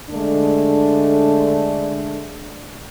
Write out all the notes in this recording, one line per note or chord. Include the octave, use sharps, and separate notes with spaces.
D3 G#3 A3 D4